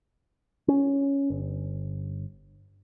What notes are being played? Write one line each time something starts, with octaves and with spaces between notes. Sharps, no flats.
C#4
G1